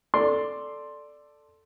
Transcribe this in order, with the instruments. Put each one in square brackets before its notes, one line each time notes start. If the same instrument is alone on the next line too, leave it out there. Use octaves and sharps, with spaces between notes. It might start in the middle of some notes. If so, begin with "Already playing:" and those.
[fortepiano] A4 D5 C6